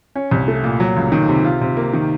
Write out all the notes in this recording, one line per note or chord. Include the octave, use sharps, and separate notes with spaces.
C#4
C2
A3
A#2
F#3
C#2
D#3
C3
F4
C3
A#3
D#3